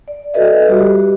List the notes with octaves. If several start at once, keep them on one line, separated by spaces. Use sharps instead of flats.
D5
F#4 A4 B4 D#5 E5
G3 F#4 G4